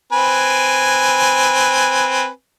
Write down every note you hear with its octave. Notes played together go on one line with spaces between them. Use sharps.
C4 B4 G#5